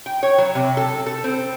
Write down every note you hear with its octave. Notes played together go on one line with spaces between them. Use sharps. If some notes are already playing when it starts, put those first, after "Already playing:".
G5
C#5
F#3
C3
A4
A4
C4